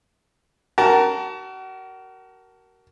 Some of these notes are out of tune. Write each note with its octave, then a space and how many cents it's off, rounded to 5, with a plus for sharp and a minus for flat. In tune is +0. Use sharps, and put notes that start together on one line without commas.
F#4 +35 A#4 +0 A5 +0